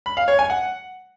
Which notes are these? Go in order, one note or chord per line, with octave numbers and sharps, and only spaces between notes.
B5
F5
C#5
G#5
F#5